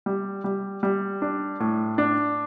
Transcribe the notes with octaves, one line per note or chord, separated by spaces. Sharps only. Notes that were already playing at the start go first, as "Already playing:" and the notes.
G3
G3
G3
D4
A2
D4